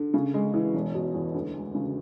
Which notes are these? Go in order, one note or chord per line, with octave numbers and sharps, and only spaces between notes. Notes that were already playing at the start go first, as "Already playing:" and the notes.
Already playing: D3
C#3
G#3
E3
E1
B2
E2
D2
G#3
C#3